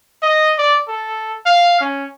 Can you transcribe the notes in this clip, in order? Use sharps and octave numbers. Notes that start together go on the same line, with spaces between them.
D#5
D5
A4
F5
C#4